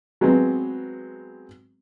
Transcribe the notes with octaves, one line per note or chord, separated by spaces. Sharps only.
F#3 G#3 B3 C4